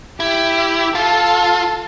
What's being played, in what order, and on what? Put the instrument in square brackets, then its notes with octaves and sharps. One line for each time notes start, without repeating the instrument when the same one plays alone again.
[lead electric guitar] E4 [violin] G4
[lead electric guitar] F4 [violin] A4